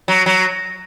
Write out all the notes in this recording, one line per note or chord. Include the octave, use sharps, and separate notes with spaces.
F#3
F#3